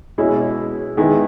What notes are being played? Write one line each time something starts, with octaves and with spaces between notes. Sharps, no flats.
B2 G#3 C#4 E4
D#3 G#3 B3 E4